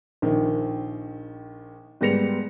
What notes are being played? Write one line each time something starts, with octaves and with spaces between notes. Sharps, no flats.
A#1 D#3
G#2 G3 B3 A#6 C#7 F7